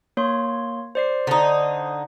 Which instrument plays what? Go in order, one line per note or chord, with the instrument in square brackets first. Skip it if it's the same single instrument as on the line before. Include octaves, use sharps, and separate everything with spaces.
[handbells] A#3 C#5 C6
C5 D5 C7
[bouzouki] D3 D#4